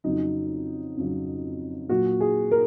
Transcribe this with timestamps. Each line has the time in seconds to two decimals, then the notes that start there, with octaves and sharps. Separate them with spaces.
0.04 F2 C#3 F#3 D#4
0.97 F2 C#3 F#3
1.89 A#2 F#3 F#4
2.21 G#4
2.51 A#4